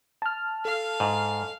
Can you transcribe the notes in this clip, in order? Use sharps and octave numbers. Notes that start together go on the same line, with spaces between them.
A5 F6
A4 F5
G#2